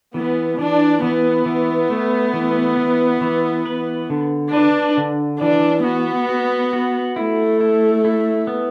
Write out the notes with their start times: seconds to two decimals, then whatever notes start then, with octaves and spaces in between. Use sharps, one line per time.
0.14 E3 B3
0.59 E3 D4
1.02 E3 B3
1.46 E3
1.90 A3
2.33 E3
2.77 E3
3.21 E3
3.65 B4
4.10 D3
4.53 D4 B4
4.97 D3
5.41 E3 D4
5.84 B3 F#4
6.29 F#4
6.73 F#4
7.16 A3 E4
7.60 E4
8.05 E4
8.47 B3